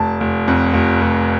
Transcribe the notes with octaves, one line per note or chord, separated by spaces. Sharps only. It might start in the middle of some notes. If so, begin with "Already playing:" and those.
Already playing: F1 A5
F1
F2
F1
F1